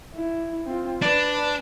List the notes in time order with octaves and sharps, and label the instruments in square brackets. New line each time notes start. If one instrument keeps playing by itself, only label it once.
[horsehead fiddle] E4
C4 F4
[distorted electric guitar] D4 [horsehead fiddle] B4 D5